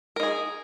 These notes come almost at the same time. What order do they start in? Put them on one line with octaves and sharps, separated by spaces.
A#4 D#4 G#4